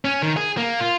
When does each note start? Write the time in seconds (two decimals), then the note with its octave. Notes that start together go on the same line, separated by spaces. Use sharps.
0.05 C#4
0.22 D#3
0.37 G#4
0.57 A#3
0.80 F4